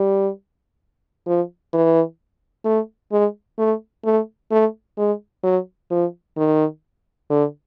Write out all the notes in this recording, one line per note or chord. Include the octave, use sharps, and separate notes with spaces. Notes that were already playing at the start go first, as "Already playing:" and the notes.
Already playing: G3
F3
E3
A3
G#3
A3
A3
A3
G#3
F#3
F3
D#3
D3